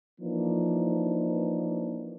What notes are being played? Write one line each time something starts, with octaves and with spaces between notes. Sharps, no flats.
E3 F3 A#3 D4 D#4